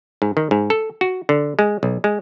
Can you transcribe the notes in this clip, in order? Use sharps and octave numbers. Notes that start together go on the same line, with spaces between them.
G#2
D#3
G#2
A4
F#4
D3
G#3
B1
G#3